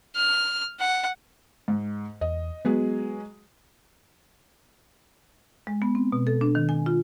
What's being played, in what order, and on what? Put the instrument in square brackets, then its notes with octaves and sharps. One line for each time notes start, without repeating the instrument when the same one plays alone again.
[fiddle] F6
F#5
[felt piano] G#2
[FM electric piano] E2 [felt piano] D#5
[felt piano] F#3 G#3 G#4 [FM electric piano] B3
[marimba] G#3
B3
C4
B2
A4
D4
D#3
G#5
F4